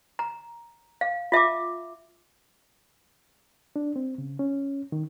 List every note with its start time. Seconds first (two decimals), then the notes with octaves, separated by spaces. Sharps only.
0.19 A#5
1.01 F5
1.32 F4 E5 A5 D6
3.76 D4
3.96 C4
4.18 C#3
4.39 C#4
4.92 D#3